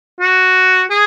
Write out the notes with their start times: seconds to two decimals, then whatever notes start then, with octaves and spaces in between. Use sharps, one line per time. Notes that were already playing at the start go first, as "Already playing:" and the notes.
0.21 F#4
0.90 G#4